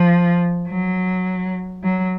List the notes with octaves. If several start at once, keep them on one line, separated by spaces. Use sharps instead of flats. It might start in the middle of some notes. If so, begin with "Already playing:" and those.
Already playing: F3
F#3
F#3